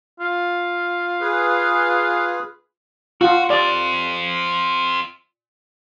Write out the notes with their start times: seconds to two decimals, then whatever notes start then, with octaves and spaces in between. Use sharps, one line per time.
0.20 F4
1.21 G#4 B4
3.21 F4 F#4
3.50 C4 F4 D5